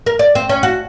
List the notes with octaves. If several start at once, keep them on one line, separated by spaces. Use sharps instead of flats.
A#4
D5
C4
C#4
F#4